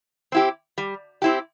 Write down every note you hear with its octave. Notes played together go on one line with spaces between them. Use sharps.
C4 E4 G4
G3
C4 E4 G4